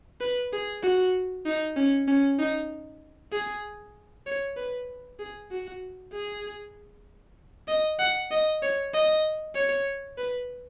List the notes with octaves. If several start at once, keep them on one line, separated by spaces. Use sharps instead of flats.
B4
G#4
F#4
D#4
C#4
C#4
D#4
G#4
C#5
B4
G#4
F#4
G#4
D#5
F#5
D#5
C#5
D#5
C#5
B4